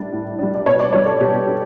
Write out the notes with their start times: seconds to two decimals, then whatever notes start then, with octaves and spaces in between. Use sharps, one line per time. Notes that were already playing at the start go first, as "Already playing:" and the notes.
Already playing: A2 G3 D4
0.13 A2
0.39 G3 D4
0.55 D5
0.66 B2 C#5
0.79 D5
0.93 G3 D4 C#5
1.06 A4
1.20 B2 G4
1.47 D4